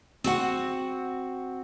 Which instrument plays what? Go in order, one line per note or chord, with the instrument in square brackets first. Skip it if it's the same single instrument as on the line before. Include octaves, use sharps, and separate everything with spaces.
[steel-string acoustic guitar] C4 F#4 F#5